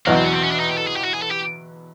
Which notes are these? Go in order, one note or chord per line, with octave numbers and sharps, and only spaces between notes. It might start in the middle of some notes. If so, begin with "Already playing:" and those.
E2 B2 F#3 A#3
C4
C#4
C4
C#4
D4
D#4
G4
A4
G#4
G4
F#4
G#4
A4
G4